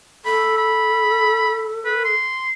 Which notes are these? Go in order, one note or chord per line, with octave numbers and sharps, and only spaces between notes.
A4 B5
B5
B4
C6